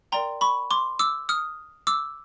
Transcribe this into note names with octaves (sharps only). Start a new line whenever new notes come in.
A#4 D5 G5 A#5 C6
B5 C#6
C6 D6
D6 E6
D#6 F6
D6 E6